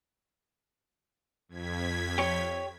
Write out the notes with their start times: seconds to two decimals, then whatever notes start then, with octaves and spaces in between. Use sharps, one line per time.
1.49 F2 G#6 B6
2.18 G4 C#5